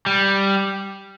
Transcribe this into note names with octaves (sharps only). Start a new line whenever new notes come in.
G3